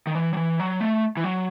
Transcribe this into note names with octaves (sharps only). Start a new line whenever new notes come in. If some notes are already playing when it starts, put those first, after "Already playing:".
D#3
E3
F#3
E3
F#3
A3
E3
F#3